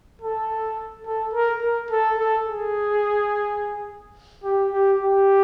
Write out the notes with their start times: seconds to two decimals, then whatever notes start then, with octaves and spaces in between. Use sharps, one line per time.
0.22 A4
1.06 A4
1.34 A#4
1.63 A#4
1.91 A4
2.18 A4
2.46 G#4
4.44 G4
4.72 G4
5.00 G4